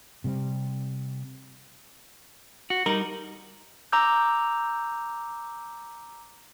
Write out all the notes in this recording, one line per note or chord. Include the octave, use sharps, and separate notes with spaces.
C3 G3 C4
F#4
G3 D#4 A#4
A#5 D6 E6 G6